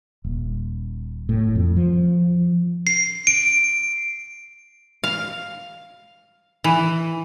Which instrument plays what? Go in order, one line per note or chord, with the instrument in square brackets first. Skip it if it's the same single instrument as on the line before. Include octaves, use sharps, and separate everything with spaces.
[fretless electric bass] D#1
A2
F2
F3
[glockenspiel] C7
D7
[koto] F5
E3